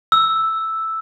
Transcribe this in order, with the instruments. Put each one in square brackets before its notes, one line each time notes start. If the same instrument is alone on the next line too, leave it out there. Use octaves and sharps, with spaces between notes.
[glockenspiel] E6